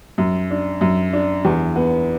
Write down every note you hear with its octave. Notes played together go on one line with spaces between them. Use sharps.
F#2
D4
F#2
D4
E2
B3